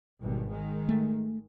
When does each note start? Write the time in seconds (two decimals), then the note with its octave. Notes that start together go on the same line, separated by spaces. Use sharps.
0.21 G#1 G2 B2
0.51 D#3 G#3
0.89 A3